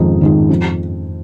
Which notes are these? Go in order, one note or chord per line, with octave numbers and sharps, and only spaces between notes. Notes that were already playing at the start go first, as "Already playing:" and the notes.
Already playing: F2 D#3 G#3 D#4
D#3 G#3 D#4
F2